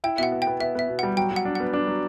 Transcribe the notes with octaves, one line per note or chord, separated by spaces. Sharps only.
E4 G5
B2 E5 F#5
B3
G5
B3
B3 E5
B3 E5
B2
G3 F#5
F#3 G5
F#3
F#5
D4
B3 F#5
D4
F#3